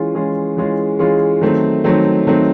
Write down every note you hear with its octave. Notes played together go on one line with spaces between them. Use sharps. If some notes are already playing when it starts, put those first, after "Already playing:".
Already playing: E3 G#3 C#4 F4 G#4
E3 G#3 C#4 F4 G#4
E3 G#3 C#4 F4 G#4
E3 G#3 C#4 F4 G#4
D#3 F#3 A3 C4
D#3 F#3 A3 C4
D#3 F#3 A3 C4